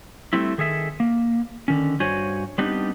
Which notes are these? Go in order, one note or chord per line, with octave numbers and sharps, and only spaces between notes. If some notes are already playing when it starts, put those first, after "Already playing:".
G3 A3 C4 E4
D#3 G#4 A4 E5
A#3
D3 D#3 C#4
G2 F#4 C5 C#5 G#5
G3 B3 C4 D4 D#4 G4